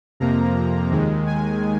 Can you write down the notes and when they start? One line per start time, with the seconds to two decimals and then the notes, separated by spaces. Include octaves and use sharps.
0.20 F2 C3 F3 A#3 A#5
0.91 D#2 D#3 G#3
1.27 G#5